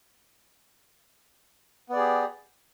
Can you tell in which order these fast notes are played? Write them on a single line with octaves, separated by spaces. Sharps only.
B3 D5 G#4 G4